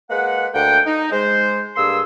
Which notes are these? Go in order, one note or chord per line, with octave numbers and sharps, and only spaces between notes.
G#3 A#3 B4 F#5
D2 A#3 F#5 G5
D#4
G#3 C5
G2 A#3 G#4 C6 E6